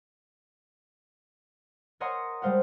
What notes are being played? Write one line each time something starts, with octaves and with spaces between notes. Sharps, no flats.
A#4 C#5 D#5 F#5 A#5 C6
G3 G#3 C5 F5 F#5